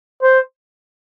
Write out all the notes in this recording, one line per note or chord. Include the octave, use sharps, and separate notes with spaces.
C5